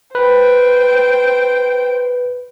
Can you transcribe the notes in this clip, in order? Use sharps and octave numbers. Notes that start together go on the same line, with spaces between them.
B4 C5 G5